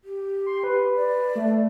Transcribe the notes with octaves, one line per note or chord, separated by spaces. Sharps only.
G4
C6
B4
D5
A3